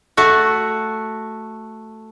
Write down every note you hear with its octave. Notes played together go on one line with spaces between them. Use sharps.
A3 F#4